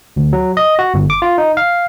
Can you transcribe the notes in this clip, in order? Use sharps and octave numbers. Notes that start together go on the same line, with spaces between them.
D2
F#3
D#5
F#4
G1
D6
F4
D#4
F5